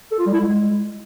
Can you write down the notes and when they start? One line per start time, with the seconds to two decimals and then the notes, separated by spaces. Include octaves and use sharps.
0.11 A4
0.19 F4
0.26 G3
0.34 E4
0.41 G#3